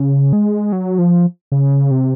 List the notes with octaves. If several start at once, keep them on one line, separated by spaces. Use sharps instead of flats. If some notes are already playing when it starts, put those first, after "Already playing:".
Already playing: C#3
G#3
F#3
F3
C#3
C3